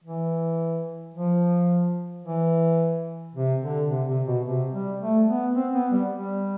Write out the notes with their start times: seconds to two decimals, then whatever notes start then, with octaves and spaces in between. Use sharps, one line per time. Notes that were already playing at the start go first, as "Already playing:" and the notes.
0.04 E3
1.14 F3
2.24 E3
3.35 C3
3.62 D3
3.90 C3
4.08 C3
4.27 B2
4.45 C3
4.72 G3
5.00 A3
5.27 B3
5.55 C4
5.74 B3
5.92 G3
6.11 G3